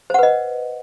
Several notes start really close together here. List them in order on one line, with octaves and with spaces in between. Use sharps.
C5 F#5 B4 D#5